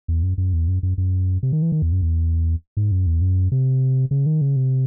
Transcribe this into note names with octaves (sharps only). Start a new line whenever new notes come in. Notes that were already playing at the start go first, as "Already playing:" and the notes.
E2
F#2
F#2
E2
F#2
F#2
F#2
C3
D#3
E3
D#3
E2
F#2
E2
G#2
F#2
E2
F#2
C3
C#3
D#3
C#3
C3